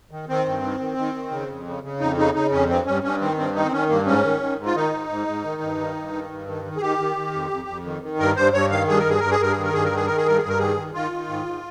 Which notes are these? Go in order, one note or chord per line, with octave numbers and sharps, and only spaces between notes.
D#3
D#3 C4
G2
D#3
D#3
D#3
D#3
C#3
F2
C#3
C#3
F2 D#4
C#3 D#4
C#3 D#4
F2 C#4
G2 C4
G2 C#4
G2 C#4
D#3 C4
G2 C4
D#3 D#4
C4
D#3 C#4
G2 A#3
G#2 C#4
D#3
D#3
G#2
F4
D#3 D#4
G#2
G#2
G#2
D#3
G2
D#3
G2
D#3
G2
D#3
D#3
G#4
D#3 G4
D#3
D#3
F2
F2
F2
D#3
D#3
G2 A#4
G2 C5
G2 C#5
D#3 F5
G2 G#4
A#4
G2 G#4
G2 A#4
G#4
G2 A#4
D#3 G#4
A#4
G2 G#4
A#4
D#3 G#4
D#3 A#4
G#4
G2 A#4
G2 G#4
A#4
D#3 G#4
D#3
D#3 F4
D#3
G#2
G#2